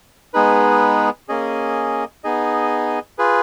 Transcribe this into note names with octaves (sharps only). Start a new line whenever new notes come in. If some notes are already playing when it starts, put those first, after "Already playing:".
G#3 B3 D#4 G#4 B4
A#3 C#4 G#4 D#5
B3 D#4 G#4 D#5
F4 G#4 B4